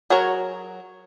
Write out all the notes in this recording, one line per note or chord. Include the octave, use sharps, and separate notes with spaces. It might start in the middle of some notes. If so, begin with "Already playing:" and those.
F#3 F#4 G#4 A#4 C#5